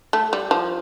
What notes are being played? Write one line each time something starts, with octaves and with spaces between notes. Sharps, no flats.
A3
G3
F3